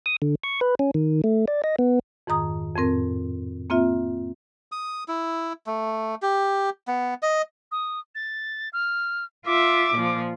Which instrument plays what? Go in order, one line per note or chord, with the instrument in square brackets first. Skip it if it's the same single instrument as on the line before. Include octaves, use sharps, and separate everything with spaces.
[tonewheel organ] D#6
D3
C#6
B4
C#4
D#3
A3
D5
D#5
B3
[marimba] F2 G#2 D#3 A#5 D#6
F2 A2 C4 A#4
A#3 C4 F4 E5
[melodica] D#6
E4
A3
G4
B3
D#5
[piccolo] D#6
A6
F6
[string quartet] F4 E5 [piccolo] D6
[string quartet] A#2 F3